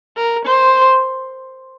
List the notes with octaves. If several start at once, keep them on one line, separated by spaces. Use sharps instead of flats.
A#4
C5